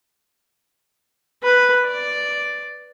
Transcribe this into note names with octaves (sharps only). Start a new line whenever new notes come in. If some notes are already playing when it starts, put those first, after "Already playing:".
B4
D5